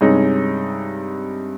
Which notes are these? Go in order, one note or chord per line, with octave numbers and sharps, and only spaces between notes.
G2 C3 G#3 C#4 D#4